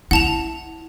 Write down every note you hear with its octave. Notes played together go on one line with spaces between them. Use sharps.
E4 F#5 A5 F7